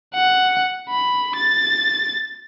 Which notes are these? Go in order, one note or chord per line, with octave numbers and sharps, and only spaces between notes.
F#5
B5
A6